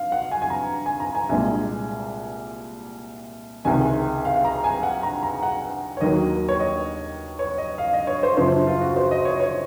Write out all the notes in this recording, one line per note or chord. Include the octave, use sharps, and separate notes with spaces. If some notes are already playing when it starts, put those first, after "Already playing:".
Already playing: F5
F#5
G#5
G#5
A#5
G#5
A#5
G#5
C2 A#2 G#3 G#5
C#2 C3 D#3 G#5
F5
A#5
G#5
F#5
A#5
A#5
F#5
C#5
D#2 D#3 F#3 A#3 D#5
C#5
D#5
C#5
D#5
F5
D#5
C#5
C5
F#2 C#3 F3 C5
F4
F#4
C5
D#5
C#5
C#5